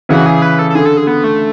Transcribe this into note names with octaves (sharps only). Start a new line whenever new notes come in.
C#3 E3 F#4
G#4
B4
A4
A4
D3 G#4
A4
G#4
B3
A3